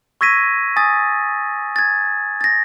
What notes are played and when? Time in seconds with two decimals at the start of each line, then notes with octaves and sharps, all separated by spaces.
0.21 C#6 E6 G#6 A#6 B6 D#7
0.76 G#5 D#6 A6
1.76 G#6 A6
2.41 A6 A#6